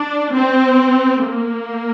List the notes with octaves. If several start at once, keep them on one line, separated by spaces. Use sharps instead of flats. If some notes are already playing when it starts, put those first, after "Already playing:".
Already playing: D4
C4
A#3